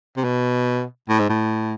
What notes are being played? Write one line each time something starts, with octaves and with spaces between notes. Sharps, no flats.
C3
B2
A2
G#2
A2